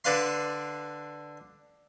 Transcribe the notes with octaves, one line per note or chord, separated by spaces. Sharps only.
D3 D4 B4 F5 C6